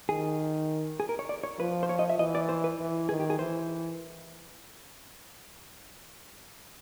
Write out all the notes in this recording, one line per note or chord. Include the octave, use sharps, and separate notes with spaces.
D#3 G#4
G#4
A#4
C#5
D5
C#5
F3 B4
C5
C#5
D#5
E5
E3 D#5
D5
C5
B4
E3
D#3 G#4
G4
G#4
E3 C5